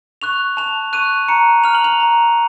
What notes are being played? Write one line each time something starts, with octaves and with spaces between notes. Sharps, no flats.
C#6 F#6 F7
A5 F7
C#6 F#6 D#7
A#5 C#7
F6 F7
F#7
F7
A#5